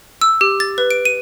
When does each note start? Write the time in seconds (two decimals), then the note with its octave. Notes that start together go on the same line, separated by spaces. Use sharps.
0.21 E6
0.41 G4
0.60 A6
0.78 B4
0.91 D7
1.05 D#7